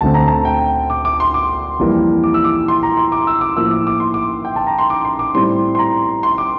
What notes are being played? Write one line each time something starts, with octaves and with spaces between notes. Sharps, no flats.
D2 D3 A3 C4 A5
A#5
A5
G5
D6
D6
C6
D6
F2 E3 G3 A#3
D6
E6
D6
C6
A#5
C6
D6
E6
D6
A2 F3 A#3 E6
D6
D6
C6
D6
G5
A5
A#5
C6
D6
C6
D6
A2 G3 C4 C6
C6
A#5
C6
D6